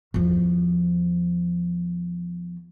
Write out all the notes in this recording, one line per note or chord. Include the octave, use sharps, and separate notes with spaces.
E2 F3